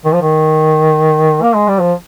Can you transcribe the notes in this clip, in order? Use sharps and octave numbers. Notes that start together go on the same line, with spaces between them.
D#3
F3
D#3
A#3
G#3
G3
F3